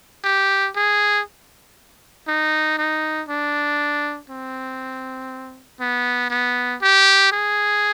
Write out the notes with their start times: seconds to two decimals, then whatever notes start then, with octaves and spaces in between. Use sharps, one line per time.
0.24 G4
0.76 G#4
2.27 D#4
2.77 D#4
3.28 D4
4.29 C4
5.80 B3
6.30 B3
6.81 G4
7.32 G#4